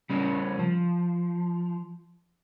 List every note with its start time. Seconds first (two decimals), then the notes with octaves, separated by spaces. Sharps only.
0.10 C#3 G3 C#4
0.59 F3